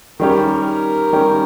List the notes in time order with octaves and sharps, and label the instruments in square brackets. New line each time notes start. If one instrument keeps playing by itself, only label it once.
[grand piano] D#3 G3 C#4 G4 [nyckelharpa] A#4
[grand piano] D#3 G3 C#4 G4